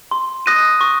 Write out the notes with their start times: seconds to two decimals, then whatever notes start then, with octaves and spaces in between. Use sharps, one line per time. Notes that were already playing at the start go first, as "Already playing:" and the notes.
0.11 C6
0.46 D#6 F#6 A#6 D#7
0.81 C#6